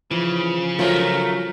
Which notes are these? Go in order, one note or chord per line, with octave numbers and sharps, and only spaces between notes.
C#3 E3 F3
F#3 A3 F4 A#4 C5